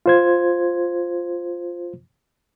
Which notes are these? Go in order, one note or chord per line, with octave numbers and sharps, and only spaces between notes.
F4 C5 G#6